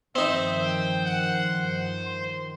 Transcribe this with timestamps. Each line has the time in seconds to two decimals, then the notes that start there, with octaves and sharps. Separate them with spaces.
0.15 G2 D#3 F3 C4 D#4 C5 E5
0.64 G5
1.05 F#5
2.06 C6